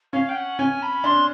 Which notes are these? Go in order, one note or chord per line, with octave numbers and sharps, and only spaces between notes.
C#4 F5
G5
F#5
C#4 G#5
B5
D4 C6